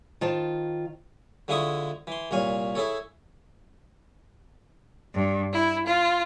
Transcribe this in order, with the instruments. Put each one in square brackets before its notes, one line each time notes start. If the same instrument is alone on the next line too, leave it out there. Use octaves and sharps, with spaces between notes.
[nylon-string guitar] D#3 F4 C5 A5
[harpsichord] D3 F3 G#3 E4 C#6 D#6
E3 C6
C2 A#2 C#5 F5 G#5
E4 G#4 A4 C#5
[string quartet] G2
E4
F4